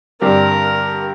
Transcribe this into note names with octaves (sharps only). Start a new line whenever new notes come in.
G2 D3 G3 C4 G4 A#4